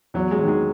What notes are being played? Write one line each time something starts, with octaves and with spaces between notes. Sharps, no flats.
E2 F#3
G#3
D#3 F#3
G#3